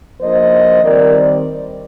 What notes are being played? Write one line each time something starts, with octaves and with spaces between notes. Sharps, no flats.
F3 A#3 D4 C5 D#5
D#3 G3 C4 A#4 D5